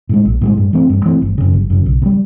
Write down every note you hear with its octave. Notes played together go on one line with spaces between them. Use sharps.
A2 F3 G#3
A#1
A2 F3 G#3
G2
E3 A3 C4
G2
E3 A3 C4
G1
F#2 C#3
G1
F#2 C#3
B1
B2
G3